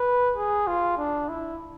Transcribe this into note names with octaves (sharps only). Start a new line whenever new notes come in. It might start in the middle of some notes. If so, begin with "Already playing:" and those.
Already playing: B4
G#4
F4
D4
E4